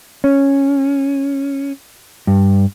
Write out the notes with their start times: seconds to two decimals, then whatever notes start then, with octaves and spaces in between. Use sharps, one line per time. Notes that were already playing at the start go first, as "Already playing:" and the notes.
0.24 C#4
2.27 G2